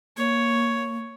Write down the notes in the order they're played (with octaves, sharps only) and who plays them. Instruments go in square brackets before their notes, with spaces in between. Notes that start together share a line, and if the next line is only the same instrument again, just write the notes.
[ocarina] A#3 [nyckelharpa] C#5